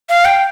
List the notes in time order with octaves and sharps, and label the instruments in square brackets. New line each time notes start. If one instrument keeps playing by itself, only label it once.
[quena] F5
G5